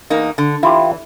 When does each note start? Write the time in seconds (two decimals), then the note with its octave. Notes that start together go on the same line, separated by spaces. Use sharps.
0.10 E2 A#3 D#4
0.38 D3
0.63 E3 E4 F4 G4